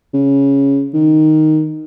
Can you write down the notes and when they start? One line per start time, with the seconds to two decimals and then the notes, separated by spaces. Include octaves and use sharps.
0.14 C#3
0.94 D#3